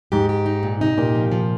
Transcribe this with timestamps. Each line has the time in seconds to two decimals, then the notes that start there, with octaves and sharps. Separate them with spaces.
0.12 G#2 G4
0.29 G4
0.46 D#4
0.63 A#2
0.81 C3 D#4
0.98 A#2 G4
1.15 F3
1.32 F3